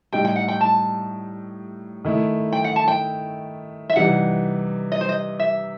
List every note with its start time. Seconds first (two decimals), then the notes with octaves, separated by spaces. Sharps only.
0.13 A2 G3 D#4 G5
0.25 G5
0.36 F#5
0.48 G5
0.61 A5
2.05 D#3 A3 E4
2.52 G5
2.64 F#5
2.76 A5
2.88 G5
3.90 E5
3.96 C3 E3 G3 D#4 F#5
4.92 D#5
5.01 C5
5.09 D#5
5.39 E5